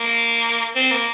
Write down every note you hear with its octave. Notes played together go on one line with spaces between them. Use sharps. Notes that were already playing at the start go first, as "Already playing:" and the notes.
Already playing: A#3
C4
A#3